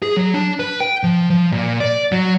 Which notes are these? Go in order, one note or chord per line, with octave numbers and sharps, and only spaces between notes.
G#4
F#3
D4
B4
G5
F3
F3
A#2
D5
F#3